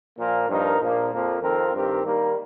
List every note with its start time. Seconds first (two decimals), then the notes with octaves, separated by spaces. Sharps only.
0.18 A#2 F3 A#3 F4 A#4
0.49 G2 F3 D#4 A#4
0.80 A#1 A#2 F3 A#3
1.11 F2 F3 A#3
1.42 F2 D#3 C4 F4 A#4
1.73 G2 D#3 C4 G4 A#4
2.04 D#3 G3 A#3 D#4 A#4